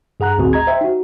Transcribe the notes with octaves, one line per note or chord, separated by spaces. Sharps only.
G2 G#4 F#5 A#5 F#6
G1 D2 A2 C4 F#4 G#4
D#5 A#5 G#6
C5 E5 G5
D#4 F#4